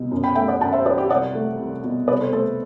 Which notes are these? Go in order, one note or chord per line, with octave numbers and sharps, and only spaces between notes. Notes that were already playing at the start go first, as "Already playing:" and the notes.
Already playing: C2 B2
F#2
G5 B5
A3 E5 G5
D5 F#5
F#2 F#5 A5
C5 E5
F#3 B4 D5
G4
C2 D5 F#5
A3
C2
B2
C2 B4 D5
A4 C5
A3 A4 C5